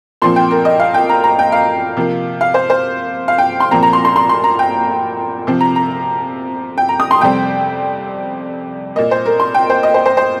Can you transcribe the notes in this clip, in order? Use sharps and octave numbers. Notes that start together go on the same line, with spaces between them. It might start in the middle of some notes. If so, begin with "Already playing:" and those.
A#2 F3 C4 C6
G5
A#4
D#5
F5
G5
A#5
A#5
G5
F5
C3 F3 A#3
F5
C5
C5
F5
G5
C6
A#2 F3 C4 A#5
A#5
C6
C6
C6
C6
A#5
G5
C3 F3 C4
A#5
A#5
G5
A#5
D#6
C6
F2 C3 G3 C4 G5
A#2 A#3 D#5
C5
A#4
C6
G5
C5
D#5
C5
C5
C5